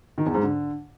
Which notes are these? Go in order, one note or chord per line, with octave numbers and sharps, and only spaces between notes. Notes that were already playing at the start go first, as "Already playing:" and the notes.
D#3
E2
G#2
D3